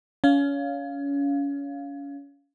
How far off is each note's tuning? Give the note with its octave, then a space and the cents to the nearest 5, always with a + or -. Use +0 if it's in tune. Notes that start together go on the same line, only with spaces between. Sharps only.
C#4 +30 F5 +0